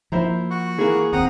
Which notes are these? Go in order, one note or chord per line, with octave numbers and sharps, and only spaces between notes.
F3 A#3 E4 C5 A#5
F#4 F#5
E3 A#3 G#4
D#1 D#2 C4 F#5 A#5 D#6